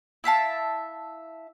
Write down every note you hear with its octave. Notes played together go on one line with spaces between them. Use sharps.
E4 E5 F5 A5